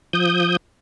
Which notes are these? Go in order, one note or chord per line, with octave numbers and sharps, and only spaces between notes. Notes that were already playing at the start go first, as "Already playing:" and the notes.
F3 D#6 G6